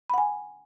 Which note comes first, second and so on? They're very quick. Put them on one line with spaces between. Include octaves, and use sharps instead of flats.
B5 F#5 G#5